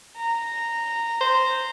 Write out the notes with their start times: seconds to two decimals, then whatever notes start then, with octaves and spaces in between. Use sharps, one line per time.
0.17 A#5
1.21 C5